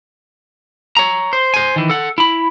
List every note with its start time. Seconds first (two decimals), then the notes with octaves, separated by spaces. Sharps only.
0.97 C#5 A#5
1.33 C5
1.54 C5 G#5
1.76 D#3 E3
1.90 A4 F#5
2.18 E4 B5